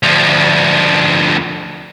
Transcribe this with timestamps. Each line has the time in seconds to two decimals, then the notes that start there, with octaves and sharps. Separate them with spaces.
0.03 D2 F3